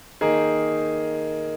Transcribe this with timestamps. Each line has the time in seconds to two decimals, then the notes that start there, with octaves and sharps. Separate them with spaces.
0.21 D#3 A#3 D#4 G#4